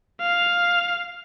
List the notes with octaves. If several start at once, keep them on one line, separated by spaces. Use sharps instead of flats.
F5